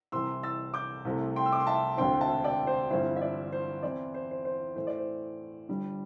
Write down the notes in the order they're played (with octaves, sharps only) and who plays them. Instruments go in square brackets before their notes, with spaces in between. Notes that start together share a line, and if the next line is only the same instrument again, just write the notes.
[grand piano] C2 C3 E3 C6 E6
E6 A6
D6 G6
C2 C3 A3
G5 C6
E6
D6
C6
E5 A5
E1 D2 D3 C4 G5 C6
E5 A5
D5 G5
C5
G1 G2 E3 C4 E4 C5
E5
D5
C5
E2 E3 C4 E4 D5
C5
C5
C5
A2 E3 A3 C5
D5
C5
G1 G2 G3 D4